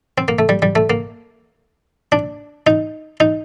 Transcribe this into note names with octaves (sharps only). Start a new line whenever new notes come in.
C4
A#3
A3
G3
G3
A3
A#3
D4
D#4
D#4